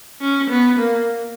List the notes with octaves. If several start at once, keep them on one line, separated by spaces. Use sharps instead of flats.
C#4
B3
A#3